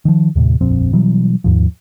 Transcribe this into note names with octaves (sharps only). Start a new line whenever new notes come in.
D#3 F3
D#2 A2 C3
D#1 A#1 F2 C4
B2 E3 F#3 G3
D#2 G#2 F3